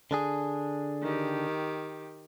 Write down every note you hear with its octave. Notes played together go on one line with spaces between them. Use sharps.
D3 D4 G#4
D#3 G4